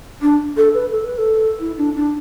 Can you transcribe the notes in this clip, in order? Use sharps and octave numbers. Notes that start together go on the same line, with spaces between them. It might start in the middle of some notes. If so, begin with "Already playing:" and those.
D4
A4
B4
A4
B4
A4
E4
D4
D4